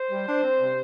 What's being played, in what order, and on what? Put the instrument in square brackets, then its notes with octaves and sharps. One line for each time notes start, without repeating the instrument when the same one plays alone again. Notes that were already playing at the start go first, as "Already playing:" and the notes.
Already playing: [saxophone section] C5
G3
D4
C4
C3